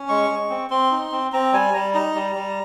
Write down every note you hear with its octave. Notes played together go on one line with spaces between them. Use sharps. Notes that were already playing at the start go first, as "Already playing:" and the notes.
Already playing: C#4
G#3 C#6
G#3
C4
C4 C6
D#4
C4
C4 A#5
G3 G#5
G3 A#5
D#4 A#5
G3
G3